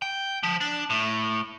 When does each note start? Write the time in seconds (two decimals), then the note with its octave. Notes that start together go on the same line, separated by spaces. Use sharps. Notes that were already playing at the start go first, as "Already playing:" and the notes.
0.02 G5
0.43 F3
0.61 D4
0.90 A2